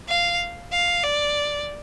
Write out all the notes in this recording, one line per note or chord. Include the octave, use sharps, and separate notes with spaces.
F5
F5
D5